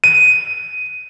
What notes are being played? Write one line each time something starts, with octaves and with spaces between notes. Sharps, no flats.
D#7